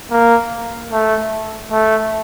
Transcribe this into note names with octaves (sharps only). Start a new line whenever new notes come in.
A#3
A3
A3